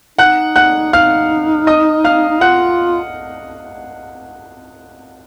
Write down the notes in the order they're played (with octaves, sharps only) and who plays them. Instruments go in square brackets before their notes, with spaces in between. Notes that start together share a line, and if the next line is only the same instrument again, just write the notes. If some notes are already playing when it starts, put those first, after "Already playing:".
[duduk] D#4 [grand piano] F#5 F#6
[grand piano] F#5 F#6
[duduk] D#4 [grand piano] F5 F6
[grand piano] D#5 D#6
F5 F6
[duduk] D#4
[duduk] F4 [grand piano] F#5 F#6